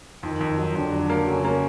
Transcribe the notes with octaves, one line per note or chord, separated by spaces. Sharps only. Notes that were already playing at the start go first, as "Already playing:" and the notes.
F2 D#3 D#4
F2
F#3
F2 D3 D4
F#3
A#3
C#3 F#3 C#4
A#3